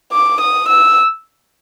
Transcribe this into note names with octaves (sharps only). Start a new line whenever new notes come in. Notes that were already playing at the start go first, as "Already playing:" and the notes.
D6
D#6
E6